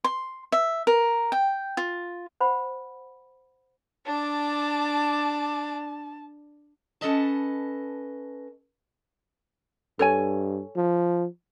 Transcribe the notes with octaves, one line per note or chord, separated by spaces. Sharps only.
C6
E5
A#4
G5
F4
C5 F#5 B5
D4 A5 D6
C#4 D#4 A4 B4 D#5 A5
G2 A4 C#5 G#5
F3